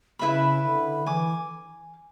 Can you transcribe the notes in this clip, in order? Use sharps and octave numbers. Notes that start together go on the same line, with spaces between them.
C#3 E4 B4 E5 B5
D3
E3 G#5 D6